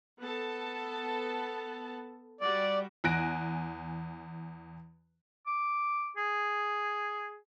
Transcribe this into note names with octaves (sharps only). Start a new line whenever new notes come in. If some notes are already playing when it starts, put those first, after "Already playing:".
B3 A4 A5
G3 F#4 D5
E2 G#5 F#6 A#6 D7
D6
G#4